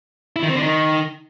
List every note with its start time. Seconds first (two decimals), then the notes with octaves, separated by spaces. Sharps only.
0.36 E4
0.43 D#3
0.49 C4
0.56 D3
0.62 D#3